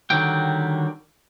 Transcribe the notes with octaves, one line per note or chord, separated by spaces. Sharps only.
D3 D#3 F#3 G3 G5